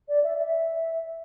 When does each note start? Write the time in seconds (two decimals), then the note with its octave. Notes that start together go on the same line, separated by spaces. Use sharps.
0.08 D5
0.23 E5
0.39 E5